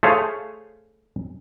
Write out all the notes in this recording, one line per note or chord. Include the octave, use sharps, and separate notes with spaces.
A3 G#4 C5 C#5 F5 G#5